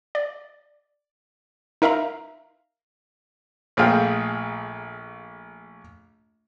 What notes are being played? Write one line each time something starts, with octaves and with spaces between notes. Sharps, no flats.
D5
D#4 A#4 E5 F5 A#5
A#1 A3 A#3 G#4 F5 G5